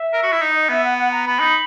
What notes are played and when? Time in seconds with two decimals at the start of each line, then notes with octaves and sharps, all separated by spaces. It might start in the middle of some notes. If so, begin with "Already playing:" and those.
Already playing: E5
0.14 A#4
0.23 F#4
0.32 E4
0.41 D#4 D#5
0.55 D#5
0.69 B3 E5
0.84 F#5
0.98 F#5
1.11 A#5
1.26 B3 B5
1.40 D#4